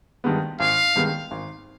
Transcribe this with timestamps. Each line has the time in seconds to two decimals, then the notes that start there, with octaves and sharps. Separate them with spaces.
0.24 G2 D#3 G#3 B3
0.60 G#1 F5
0.95 G2 D#3 G#3 B3
1.31 G#1